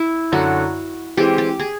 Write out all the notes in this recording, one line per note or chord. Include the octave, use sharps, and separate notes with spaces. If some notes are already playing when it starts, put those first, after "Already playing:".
Already playing: E4
F#2 D3 F#3 F#4
E3 G#3 C4 G4
G4
G#4